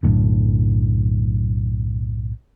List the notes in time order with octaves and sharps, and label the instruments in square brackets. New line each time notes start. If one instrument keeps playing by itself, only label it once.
[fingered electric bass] B1 F#2 A2 D3